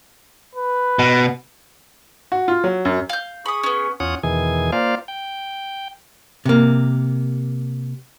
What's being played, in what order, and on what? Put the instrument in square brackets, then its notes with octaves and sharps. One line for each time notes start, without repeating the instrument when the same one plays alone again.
[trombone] B4
[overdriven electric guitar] B2
[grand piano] F#4
F4
F#3
F#2
[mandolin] F5 G6
[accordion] G#4 C#6 [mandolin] B5 D#6
[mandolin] B3 C#4
[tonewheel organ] E2 C#4 F4 C#5 F#5 D#6
E2 B2 D#3 E3 G#4 G#5
A#3 F4 C5 D5 F5
G5
[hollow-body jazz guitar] C3 A#3